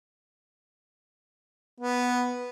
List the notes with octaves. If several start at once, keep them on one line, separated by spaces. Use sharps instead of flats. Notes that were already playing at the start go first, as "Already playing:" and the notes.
B3